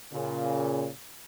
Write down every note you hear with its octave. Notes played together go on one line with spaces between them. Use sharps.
A#2 C#3